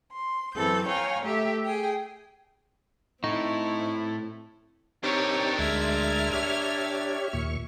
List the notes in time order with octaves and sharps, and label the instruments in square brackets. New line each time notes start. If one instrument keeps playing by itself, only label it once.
[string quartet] C6
F#2 E3 C4 A4 G6
C#5 F5 G5 G#5 A#5
A3 G4 A4 E5
G#4 G5
[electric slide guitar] A2 [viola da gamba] C4 E4 [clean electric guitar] D#4 [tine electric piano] C#6
[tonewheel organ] C4 D#4 G4 [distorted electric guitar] D4 A#4 [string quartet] C#5
[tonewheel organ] D2 G#3 [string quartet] E5 F6 G#6
[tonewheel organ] G4 C#5
D#2 A#2 C#6